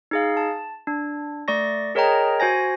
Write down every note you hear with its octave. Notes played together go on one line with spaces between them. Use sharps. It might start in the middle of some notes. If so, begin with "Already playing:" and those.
D#4 G#4 F5
A5
D4
A3 D5 C#6 A#6
G#4 A#4 C#5 D#5 G5 A#5
F#4 C5 G#5 A#6